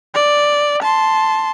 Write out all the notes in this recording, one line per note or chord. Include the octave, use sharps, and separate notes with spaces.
D5
A5 C6